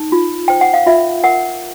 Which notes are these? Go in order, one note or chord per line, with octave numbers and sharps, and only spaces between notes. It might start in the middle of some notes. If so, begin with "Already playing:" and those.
Already playing: D#4
F4
C5 G5
F#5
F5
F4 E5
A#4 F#5